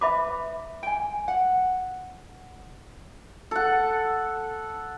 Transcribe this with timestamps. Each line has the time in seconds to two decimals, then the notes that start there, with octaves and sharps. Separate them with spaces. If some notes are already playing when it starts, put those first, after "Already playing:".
0.01 B4 E5 B5 D6
0.83 G5 G#5
1.28 F#5
3.51 A4 F#5